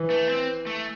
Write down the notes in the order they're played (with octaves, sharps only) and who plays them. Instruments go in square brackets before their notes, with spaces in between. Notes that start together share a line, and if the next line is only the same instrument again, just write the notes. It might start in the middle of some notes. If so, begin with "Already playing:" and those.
Already playing: [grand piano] E3
[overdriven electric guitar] A3
C4
A3